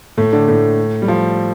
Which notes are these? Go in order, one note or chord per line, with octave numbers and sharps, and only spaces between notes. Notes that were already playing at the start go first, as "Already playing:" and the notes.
A2 A3
D3 D4
A2 A3
G3
F3